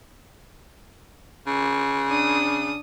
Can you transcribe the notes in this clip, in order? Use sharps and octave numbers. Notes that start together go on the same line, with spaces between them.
C#3
D4 D#6